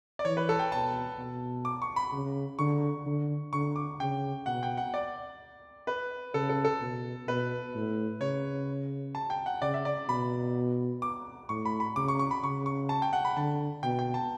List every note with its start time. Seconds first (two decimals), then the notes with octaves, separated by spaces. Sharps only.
0.19 D5
0.25 E3 C#5
0.37 B4
0.49 A4
0.59 G5
0.72 B2 A5
1.18 B2
1.65 D6
1.82 C#6
1.96 B5
2.12 C#3
2.59 D3 C#6
3.06 D3
3.53 D3 C#6
3.76 D6
4.00 C#3 G5
4.46 B2 F#5
4.63 G5
4.77 F#5
4.94 D5
5.87 B4
6.34 C#3 A4
6.49 A4
6.65 A4
6.81 B2
7.28 B2 B4
7.74 A2
8.21 C#3 C#5
9.15 A5
9.30 G5
9.46 F#5
9.62 C#3 D5
9.74 E5
9.85 D5
10.09 B2 B5
11.02 D6
11.49 A2 C#6
11.65 B5
11.80 B5
11.96 C#3 D6
12.08 C#6
12.19 C#6
12.31 B5
12.43 C#3 C#6
12.66 C#6
12.89 A5
13.02 G5
13.13 F#5
13.25 B5
13.36 D3 A5
13.83 B2 G5
13.99 G5
14.14 A5